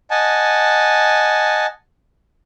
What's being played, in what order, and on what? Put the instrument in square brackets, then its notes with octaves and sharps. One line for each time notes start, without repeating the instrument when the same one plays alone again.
[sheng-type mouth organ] D#5 F#5 G#5 A5